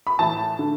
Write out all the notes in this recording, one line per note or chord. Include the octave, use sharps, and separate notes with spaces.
B5
A2 E3 A5
D3